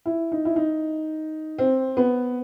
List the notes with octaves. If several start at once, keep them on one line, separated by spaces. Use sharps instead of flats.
E4
D#4
E4
D#4
C4
B3